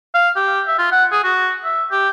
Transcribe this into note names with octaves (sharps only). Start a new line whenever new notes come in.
F5
G4
E5
F4
F#5
G#4
F#4
E5
G4